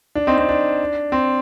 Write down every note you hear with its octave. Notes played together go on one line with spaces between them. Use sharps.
D4
C4 D#4
C4
D4
C4